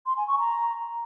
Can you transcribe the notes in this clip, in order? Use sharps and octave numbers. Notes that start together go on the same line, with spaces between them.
C6
G#5
C#6
A#5